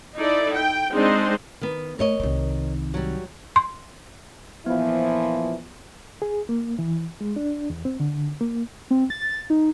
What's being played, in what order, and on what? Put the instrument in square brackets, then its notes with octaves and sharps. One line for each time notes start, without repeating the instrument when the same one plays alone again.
[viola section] D#4 E4 A4 D5
G5
G#3 C4 D4 D#4 C5 D#5
[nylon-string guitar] D#3 B3
[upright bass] A3 [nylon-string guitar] A#4 C#5 D#5
[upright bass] C2 D#3
[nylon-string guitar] F#3 G3
[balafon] C6
[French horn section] A#2 E3 F3 [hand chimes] B3 F4 [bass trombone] E4
[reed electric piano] G#4
A#3
E3
G#3
D4
E2
C4
D3
A#3
[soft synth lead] C4
A6
D#4